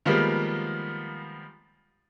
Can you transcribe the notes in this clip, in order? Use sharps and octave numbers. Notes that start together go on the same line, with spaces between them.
D#3 F3 G3 G#3 A#3 B3